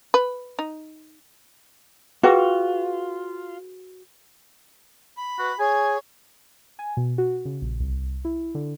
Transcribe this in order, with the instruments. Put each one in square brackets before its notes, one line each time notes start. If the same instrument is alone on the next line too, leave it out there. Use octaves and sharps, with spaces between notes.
[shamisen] B4
D#4
[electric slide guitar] F4 [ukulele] F#4 [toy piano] G#4 B4 G5
[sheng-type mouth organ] B5
[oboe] F#4 [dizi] B4
[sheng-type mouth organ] G#4 [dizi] C#5 [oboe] G#5
[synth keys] G#5
B2
F#4
C#3
A#1
C2
E4
D3